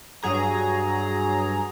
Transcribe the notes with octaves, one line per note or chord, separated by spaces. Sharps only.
G2 F#3 G#4 A#5